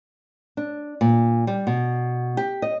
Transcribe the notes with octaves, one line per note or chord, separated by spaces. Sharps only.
D4
A#2
G3
B2
G4
D#5